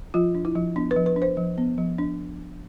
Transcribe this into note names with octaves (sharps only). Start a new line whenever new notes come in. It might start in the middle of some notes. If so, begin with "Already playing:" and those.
F3 F4
D4
E4
F3
B3 D4
B4
F3
B4
D4
C5
F3
B3
F3
D4